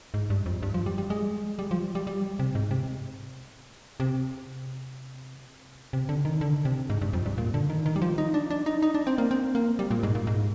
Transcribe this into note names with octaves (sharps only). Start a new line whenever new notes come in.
G#2
G2
F2
G2
F3
G3
G3
G#3
G3
F3
G3
G3
C3
G#2
C3
C3
C3
D3
D#3
D3
C3
G#2
G2
F2
G2
A#2
D3
D#3
D#3
G3
F3
D#4
D4
D4
D#4
D#4
D4
C4
A#3
C4
A#3
G3
A#2
G#2
A#2
G#2